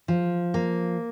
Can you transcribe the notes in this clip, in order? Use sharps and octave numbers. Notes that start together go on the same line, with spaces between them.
F3
A#3